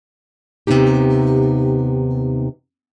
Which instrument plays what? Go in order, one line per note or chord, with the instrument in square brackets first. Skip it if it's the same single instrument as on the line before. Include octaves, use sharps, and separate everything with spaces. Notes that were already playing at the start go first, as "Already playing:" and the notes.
[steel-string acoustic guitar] D#2 C3 B3 D4 D#4 G4